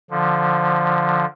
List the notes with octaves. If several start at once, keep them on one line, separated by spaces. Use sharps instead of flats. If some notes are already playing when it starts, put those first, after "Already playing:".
D3 F3